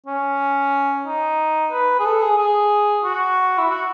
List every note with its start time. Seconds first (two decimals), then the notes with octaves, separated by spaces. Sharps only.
0.06 C#4
1.07 D#4
1.72 B4
1.99 G#4
2.06 A4
2.22 G#4
2.38 G#4
3.04 F#4
3.58 E4
3.70 F#4